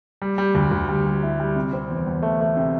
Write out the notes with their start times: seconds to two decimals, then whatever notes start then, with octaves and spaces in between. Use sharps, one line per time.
0.22 G3
0.38 G3
0.55 D2
0.71 D2
0.89 G3
1.06 G3
1.23 E4
1.40 G3
1.56 C3
1.73 C4
1.90 E2
2.07 E2
2.23 A3
2.40 A3
2.57 C3